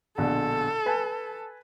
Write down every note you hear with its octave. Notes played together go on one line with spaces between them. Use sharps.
A#1 B2 D3 A4
B4 G#5 A5